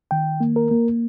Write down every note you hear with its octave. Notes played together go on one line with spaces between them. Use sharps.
D#3 G5
A#3
A#4
A#3